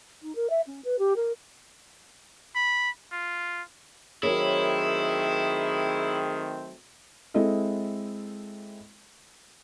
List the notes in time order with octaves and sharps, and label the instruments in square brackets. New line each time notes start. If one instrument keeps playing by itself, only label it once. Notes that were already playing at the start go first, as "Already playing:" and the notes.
[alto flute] D#4
A#4
E5
C#4
B4
G4
A#4
[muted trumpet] B5
F4
[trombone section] D#3 A3 C4 [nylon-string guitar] F#3 A#4 C#5 [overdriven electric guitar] E4 [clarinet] G#4
[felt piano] G#3 C4 E4 A4 D#5 E5